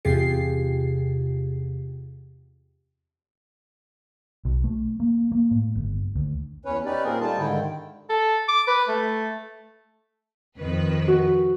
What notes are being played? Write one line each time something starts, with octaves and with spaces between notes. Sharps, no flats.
E2 C3 F4 G4 G#4 C7
B1
A3
A#3
A#3
A2
G1
D2
E2 C#4 B4 C#5
C#4 D#4 G4 B4 D5
A#2 A#3 C4 G#4 A#4
G3 A3 D#4 F4 A5
G#2 D3 D#3 E4 G5
A4
D6
B4
A3
F2 D#3 B4
F#4